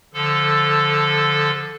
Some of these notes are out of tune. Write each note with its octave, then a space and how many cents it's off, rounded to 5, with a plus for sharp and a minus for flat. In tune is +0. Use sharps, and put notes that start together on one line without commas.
D3 +0 F3 +0 A4 +0